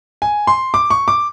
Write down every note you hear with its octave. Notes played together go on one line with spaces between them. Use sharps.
G#5
C6
D6
C#6
D6